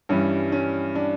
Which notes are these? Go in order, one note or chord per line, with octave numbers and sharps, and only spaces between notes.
G2 E3 G3 C#4
C#4
D4